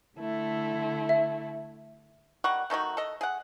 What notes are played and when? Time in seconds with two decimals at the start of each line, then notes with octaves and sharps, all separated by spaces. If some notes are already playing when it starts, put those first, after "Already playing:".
0.18 D3 A3 E4
1.09 E5
2.44 D#3 G3 F#5 C#6
2.70 D#3 A3 D#4 F#4
2.97 A4 D#5
3.21 G#4 F#5